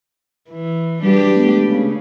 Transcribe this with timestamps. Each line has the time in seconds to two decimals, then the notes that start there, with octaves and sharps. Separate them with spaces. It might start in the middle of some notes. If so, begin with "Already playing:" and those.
0.50 E3
1.03 G3 D4 G4 B4
1.36 G#3 A3 B3
1.67 C#3